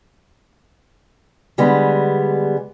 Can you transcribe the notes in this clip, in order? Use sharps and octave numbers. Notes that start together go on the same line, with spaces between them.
D3 G3 G#3 B3